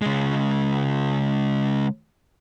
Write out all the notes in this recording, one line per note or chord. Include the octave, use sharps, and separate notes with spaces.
C#3 G#3